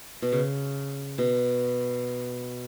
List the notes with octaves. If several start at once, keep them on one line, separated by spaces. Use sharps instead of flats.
B2
C#3
B2